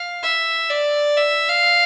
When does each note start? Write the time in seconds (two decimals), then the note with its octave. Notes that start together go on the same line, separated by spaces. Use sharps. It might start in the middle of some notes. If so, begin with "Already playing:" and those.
Already playing: F5
0.23 E5
0.70 D5
1.17 E5
1.49 F5